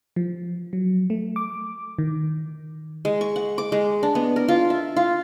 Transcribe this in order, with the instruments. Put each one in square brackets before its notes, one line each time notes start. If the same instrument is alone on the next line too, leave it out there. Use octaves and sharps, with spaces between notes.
[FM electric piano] F3
F#3
A3
D6
D#3
[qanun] G#3
C#6
F#5
D6
G#3
D4
B3
A#4
F4
E5
F4